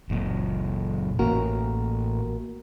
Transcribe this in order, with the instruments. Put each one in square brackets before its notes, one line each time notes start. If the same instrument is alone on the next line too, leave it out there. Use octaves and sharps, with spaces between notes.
[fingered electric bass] F#1 A#2
[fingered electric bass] A1 [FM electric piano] A#3 F#4 A#4